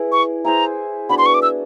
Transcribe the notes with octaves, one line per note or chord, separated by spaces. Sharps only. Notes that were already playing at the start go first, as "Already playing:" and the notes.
Already playing: E4 G#4 B4 D5
C#6
E4 G#4 C5 E5 A#5
B3 D4 F#4 B5
C6
C#6
D6
E6